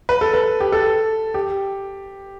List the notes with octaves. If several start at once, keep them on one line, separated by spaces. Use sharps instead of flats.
B4
A4
B4
G4
A4
G4